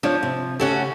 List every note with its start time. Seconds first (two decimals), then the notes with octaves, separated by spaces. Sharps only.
0.03 F3 D4 F4 C#5
0.23 C3
0.60 C#3 A3 C#4 F#4 G4